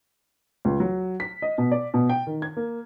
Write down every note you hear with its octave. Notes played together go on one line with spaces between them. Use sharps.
C#2
F#3
B6
D#5
B2
D5
B2
G5
D#3
G#6
A#3